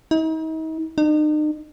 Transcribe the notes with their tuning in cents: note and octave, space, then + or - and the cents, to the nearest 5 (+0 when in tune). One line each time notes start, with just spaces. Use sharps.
D#4 +40
D#4 -40